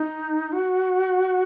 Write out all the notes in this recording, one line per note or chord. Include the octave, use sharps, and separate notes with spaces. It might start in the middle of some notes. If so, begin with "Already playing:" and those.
Already playing: D#4
F#4